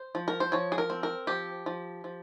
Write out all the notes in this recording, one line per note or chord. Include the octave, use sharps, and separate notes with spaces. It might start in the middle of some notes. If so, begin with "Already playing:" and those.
Already playing: C5
F3
A#4
C5
F3 C#5
G#4
A#4
C4
A#4
F3 G4
F3
F3